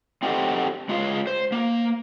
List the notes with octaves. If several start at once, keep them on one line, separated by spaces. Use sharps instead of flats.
C4 D#4 F#4 G4 A4
G#3 F4 G#4 F5
C5
A#3